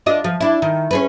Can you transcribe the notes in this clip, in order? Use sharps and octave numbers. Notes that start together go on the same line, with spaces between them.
D4 F4 D#5
F3
D4 E4
D#3
C#4 G#4 B4